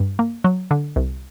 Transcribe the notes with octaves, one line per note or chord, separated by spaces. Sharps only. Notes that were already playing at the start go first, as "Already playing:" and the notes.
Already playing: G2
A#3
F#3
D3
C2